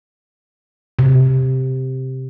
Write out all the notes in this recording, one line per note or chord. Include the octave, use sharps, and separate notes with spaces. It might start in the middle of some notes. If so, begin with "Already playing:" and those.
C3